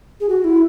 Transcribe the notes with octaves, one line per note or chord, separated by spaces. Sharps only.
G#4
F#4
E4